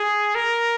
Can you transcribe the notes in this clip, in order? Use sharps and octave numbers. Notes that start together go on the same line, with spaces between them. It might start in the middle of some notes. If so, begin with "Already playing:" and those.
Already playing: G#4
A#4